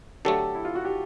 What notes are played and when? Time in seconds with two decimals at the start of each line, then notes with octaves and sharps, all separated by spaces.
0.25 D3 F#3 A3 G4 A4
0.55 E4
0.65 F4
0.75 F#4
0.85 G4